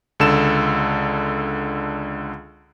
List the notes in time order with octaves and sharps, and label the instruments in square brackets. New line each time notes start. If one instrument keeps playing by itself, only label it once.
[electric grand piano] C#2 D3 A4 E7